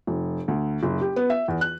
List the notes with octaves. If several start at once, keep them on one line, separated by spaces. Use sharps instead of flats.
F1
D2
F#1
G4
B3
E5
E2
F#6